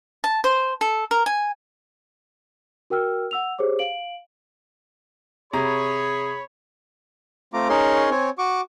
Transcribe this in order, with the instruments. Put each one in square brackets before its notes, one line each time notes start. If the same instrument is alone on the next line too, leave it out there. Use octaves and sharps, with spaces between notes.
[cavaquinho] A5
C5
A4
A#4
G#5
[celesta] F#4 A#4 G5 E6 F6
F#5 E6 F7
G4 G#4 C5 C#5 D6
F5 D7 F#7
[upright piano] C3 A#5 [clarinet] G#4 [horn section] C#5 B5
[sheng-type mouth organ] A3 C4 F4 A#5 D6
C#4 D#4 G#4 A#4 C#5 C6
C4 C#5 G#5
F#4 C#6 D6